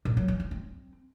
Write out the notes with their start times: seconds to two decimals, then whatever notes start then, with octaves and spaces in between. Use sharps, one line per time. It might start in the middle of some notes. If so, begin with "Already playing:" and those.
0.05 A#2
0.17 F#3
0.28 E3
0.40 C#4
0.51 C4